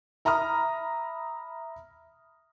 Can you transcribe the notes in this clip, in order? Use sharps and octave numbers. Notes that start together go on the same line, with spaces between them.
E5 A#5 B5 D#6 F6